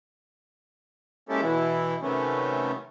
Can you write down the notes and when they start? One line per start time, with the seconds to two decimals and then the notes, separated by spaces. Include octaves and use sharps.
1.29 G#3 A#3 C#4 E4 G4 A4
1.42 B2 E3 E4
2.02 C3 D#3 F#3 A3 B3 C#4